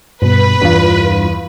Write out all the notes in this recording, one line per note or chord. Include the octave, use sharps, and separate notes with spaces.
G2 B2 B4
E2 G2 F4